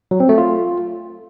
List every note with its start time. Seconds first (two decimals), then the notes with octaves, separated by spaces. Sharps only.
0.11 F#3
0.20 C4
0.29 A3
0.38 F4